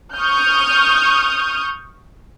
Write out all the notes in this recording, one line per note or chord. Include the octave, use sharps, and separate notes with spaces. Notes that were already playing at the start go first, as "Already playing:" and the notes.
C#6 D#6 F6 G6